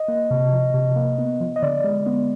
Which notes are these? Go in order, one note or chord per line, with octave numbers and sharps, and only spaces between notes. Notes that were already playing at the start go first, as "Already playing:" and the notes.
Already playing: D#5
A#3
C3
F3
C3
A#3
B3
F3
D#5
D3 D5
G#3
B3